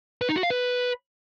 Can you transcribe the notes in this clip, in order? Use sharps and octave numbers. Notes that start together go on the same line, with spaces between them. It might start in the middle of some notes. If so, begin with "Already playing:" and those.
B4
D#4
F#4
F5
B4